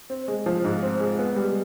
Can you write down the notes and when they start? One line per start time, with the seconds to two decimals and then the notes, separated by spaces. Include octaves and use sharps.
0.10 C4
0.28 G#3
0.46 F3
0.64 G#2
0.82 C4
1.00 G#3
1.19 B3
1.36 G3